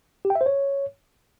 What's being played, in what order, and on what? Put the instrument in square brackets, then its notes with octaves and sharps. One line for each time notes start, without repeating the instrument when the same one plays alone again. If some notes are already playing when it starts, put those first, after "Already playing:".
[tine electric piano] G4
G5
E5
C5
C#5